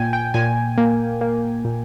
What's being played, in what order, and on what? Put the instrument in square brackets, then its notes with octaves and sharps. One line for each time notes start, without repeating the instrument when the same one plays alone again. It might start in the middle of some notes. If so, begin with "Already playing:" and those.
Already playing: [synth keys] A#2 G5 G#5
G5
A#2 G#5
A#3
A#3
A#2